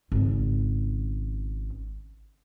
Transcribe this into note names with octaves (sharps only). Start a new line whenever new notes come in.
G#1 C#3